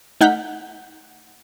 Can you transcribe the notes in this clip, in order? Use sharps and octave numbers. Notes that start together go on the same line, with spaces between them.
A3 D#4 F#5 F6 G6 B6